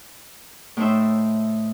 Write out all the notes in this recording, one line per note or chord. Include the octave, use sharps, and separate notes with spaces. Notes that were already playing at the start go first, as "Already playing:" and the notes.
A2 A3 D#4 C5 E5